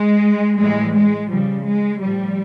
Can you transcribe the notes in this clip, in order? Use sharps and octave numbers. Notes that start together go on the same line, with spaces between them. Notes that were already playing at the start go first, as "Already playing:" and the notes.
Already playing: G#3
A2 E3 G3 G#3
G#3
C#3 F3 G3
G#3
A2 F3 G3